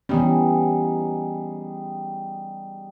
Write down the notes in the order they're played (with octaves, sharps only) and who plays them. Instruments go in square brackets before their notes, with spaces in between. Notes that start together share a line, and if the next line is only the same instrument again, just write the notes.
[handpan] E3 B3 C#4 [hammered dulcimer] G3 D#4 G#4